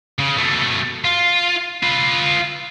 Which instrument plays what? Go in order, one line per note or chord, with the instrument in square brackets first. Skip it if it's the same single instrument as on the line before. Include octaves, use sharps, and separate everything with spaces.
[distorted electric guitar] C#3
B2 A3
F4
F4 B4